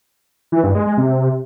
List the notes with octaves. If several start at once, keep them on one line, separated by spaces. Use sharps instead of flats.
E3
G2
G#3
G#3
C3